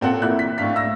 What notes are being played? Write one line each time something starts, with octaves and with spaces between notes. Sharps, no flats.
A#2 C4 A4 F#5
A#3 E4 F#6
B6
A2 A3 D4 F5 B6
E5 E6 A#6